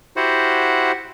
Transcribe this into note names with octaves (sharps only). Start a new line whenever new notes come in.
E4 F#4 G4 C5 F#5